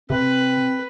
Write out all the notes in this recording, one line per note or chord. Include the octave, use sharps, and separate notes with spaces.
C3 C4 B4